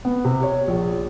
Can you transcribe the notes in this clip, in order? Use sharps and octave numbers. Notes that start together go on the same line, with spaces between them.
B3
C3
C#5
A#1